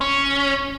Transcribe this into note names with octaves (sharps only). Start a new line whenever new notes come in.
C#4